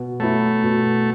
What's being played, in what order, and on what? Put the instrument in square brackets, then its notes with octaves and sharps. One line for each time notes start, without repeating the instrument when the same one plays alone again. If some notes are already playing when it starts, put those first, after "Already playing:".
Already playing: [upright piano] B2
[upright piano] F#3 B3 E4 [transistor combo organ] A3
[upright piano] B2